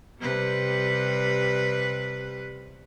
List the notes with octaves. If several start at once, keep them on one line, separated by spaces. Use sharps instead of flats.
C3 G3 B4